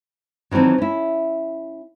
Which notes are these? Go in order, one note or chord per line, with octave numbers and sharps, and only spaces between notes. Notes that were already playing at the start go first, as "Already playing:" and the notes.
D#3 E3 F#3 C4 D4
C#4 E4